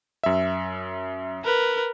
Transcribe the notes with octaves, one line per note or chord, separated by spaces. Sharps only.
F#2 E5
A#4 B4